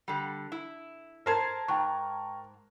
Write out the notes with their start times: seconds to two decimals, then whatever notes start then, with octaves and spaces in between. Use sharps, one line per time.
0.08 D3 G3
0.52 E4
1.26 A4 A#4 C5 A5 G#6
1.68 G#2 G5 C#6